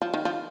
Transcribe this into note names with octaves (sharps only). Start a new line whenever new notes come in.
F3
D#3
F3